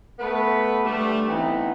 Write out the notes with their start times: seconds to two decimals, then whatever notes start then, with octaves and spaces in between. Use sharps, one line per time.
0.19 A3 B3 B4
0.84 D3 G3 A3
1.28 E3 B3 C4 D#4